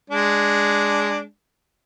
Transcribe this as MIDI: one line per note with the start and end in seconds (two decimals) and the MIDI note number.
0.10 1.23 56
0.10 1.23 62